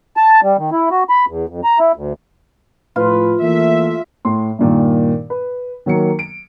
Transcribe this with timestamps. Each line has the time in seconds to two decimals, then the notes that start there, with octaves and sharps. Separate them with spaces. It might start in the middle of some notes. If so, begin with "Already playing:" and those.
0.17 A5
0.43 G3
0.58 D#3
0.72 E4
0.91 F#4
1.09 B5
1.28 E2
1.49 F2
1.64 A#5
1.79 E4
1.96 D2
2.96 A2 F3 F4 B4
3.42 E3 A3 A#3 E5
4.25 A2 C6
4.59 G2 A#2 D#3
5.30 B4
5.86 D#3 F#3 A#3 C#7
6.19 D7